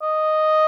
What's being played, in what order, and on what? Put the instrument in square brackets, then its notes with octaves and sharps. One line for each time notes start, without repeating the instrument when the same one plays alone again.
[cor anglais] D#5